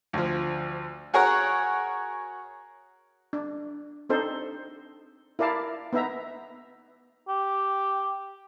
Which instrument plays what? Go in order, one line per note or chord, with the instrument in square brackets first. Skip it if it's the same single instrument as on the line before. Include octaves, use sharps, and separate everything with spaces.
[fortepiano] D2 F3
F#4 G#4 A#4 C#5 F#5
[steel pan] D4
C4 D4 D#4 A4 C5
E4 A#4 D5 F5 A5
B3 D#4 E5 A#5
[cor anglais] G4